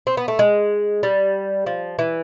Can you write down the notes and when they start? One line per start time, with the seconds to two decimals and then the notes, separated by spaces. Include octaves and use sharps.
0.07 C4
0.17 B3
0.28 A3
0.39 G#3
1.03 G3
1.66 F3
1.99 E3